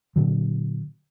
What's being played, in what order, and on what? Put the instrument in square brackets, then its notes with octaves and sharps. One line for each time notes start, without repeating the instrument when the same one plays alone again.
[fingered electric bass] A#2 D3 F#3